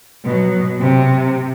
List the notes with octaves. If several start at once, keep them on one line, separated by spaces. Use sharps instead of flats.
B2 F#3
C3